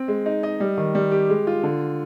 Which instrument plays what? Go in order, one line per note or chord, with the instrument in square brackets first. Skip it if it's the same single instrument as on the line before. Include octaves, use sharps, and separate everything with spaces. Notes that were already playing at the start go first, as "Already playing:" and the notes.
Already playing: [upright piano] C4
G#3
D#4
D#5
G3
D#3
G3
G4
G#3
F4
D3